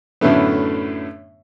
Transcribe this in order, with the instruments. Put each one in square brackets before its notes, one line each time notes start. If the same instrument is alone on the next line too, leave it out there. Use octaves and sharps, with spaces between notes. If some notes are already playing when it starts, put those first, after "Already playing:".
[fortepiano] F#2 A2 D3 A3 B3